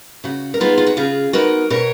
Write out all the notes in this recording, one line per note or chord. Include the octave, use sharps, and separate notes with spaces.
C#3 F#4
A#4
G#3 B3 D#4 F4 G#4
F4
F#4
C#3 F4 G#4
G#3 B3 D#4 F#4 A#4
B2 A#4 C#5